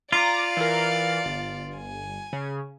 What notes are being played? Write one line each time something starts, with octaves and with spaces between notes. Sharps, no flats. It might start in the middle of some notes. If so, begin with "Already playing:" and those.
F4 D5 F5 A#5 D6
E3 A#4
G1
G#5
C#3